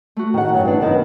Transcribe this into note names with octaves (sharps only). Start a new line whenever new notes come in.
A3 F#4
D#3 F#5
G2 F#3
E3 D4
F#2 D#3 B3